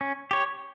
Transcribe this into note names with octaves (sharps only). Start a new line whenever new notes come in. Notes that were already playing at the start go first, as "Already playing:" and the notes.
C#4
G4 C#5